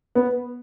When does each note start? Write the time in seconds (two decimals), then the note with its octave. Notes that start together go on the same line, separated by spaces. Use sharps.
0.15 B3